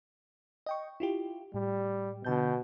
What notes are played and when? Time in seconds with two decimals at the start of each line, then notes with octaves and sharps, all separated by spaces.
0.66 D#5 G5 C#6
1.00 E4 F4 G4
1.54 A2 G3
2.25 B2 D3 A5 G6